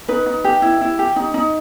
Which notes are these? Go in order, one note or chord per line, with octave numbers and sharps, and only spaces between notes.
D#4 B4
D#4
G4
E4
E4
G4
D#4
D#4